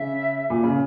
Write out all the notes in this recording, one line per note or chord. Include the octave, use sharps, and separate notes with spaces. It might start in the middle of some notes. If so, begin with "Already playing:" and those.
Already playing: C#3 E5
A#2
C#3